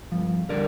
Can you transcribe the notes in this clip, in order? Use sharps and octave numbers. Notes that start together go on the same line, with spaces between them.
G2 F3
D3 G3 A#4 D5